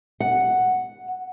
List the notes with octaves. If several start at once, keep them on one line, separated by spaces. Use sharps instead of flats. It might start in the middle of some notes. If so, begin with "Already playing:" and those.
F#5